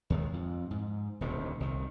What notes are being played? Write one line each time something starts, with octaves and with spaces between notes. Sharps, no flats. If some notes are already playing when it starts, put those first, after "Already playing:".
D#2 D#3 G#3
F2
G#2
D#1 D2 C3 D#3
C2 D#3